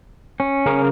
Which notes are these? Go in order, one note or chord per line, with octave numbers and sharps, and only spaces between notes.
C#4
C#3 A#4